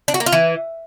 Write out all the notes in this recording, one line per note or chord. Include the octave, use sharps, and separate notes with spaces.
D4
F#4
A#3
F4
E3